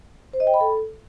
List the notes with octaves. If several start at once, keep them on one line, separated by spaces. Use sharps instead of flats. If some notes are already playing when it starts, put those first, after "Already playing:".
C5
D#5
G5
B5
A4